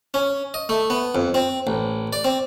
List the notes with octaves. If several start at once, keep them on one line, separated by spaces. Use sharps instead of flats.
C#4
D#5
A3
B3
F2
C4
A1
D5
C4